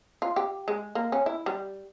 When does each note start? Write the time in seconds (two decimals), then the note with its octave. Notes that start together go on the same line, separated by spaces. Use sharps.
0.22 F4
0.36 G4
0.68 G#3
0.95 A#3
1.12 C#4
1.26 E4
1.46 G3